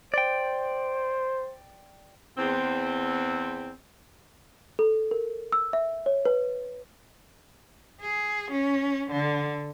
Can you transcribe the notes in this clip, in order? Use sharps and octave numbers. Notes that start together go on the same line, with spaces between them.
C5 D5 G5
E2 C4
A4
A#4
E6
E5
C#5
B4
G#4
C#4
D3